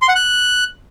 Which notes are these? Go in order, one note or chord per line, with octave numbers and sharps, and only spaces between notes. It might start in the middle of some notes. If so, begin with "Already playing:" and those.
C6
F#5
F#6